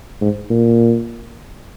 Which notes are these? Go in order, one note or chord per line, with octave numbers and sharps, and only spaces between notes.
G#2
A#2